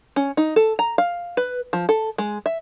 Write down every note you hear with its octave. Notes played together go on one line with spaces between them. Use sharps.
C#4
D#4
A4
A#5
F5
B4
F3
A4
G#3
E5